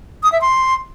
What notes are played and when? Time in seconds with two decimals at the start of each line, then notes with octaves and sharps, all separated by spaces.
0.23 D#6
0.32 E5
0.41 C6